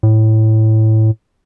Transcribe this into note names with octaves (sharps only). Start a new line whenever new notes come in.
A2